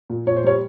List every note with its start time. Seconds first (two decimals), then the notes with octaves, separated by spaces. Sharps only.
0.10 A#2
0.27 A#2 C#5
0.36 C5
0.44 G3 C#5